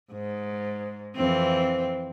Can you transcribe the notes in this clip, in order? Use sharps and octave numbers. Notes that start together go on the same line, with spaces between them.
G#2
F2 E3 C4